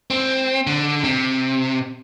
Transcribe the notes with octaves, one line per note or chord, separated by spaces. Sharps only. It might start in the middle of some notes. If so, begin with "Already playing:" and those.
C4
D3
C3